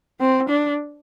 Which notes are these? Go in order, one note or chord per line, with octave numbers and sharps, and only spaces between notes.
C4
D4